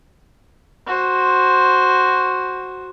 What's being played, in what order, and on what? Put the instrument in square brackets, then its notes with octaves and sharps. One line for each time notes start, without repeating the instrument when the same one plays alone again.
[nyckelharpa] F#4 C5